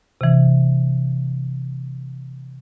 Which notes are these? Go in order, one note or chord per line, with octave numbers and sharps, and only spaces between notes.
C3 E3